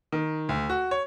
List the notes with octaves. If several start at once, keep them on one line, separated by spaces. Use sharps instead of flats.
D#3
D2
F#4
C#5